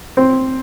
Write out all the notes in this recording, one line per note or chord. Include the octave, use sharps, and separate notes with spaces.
C4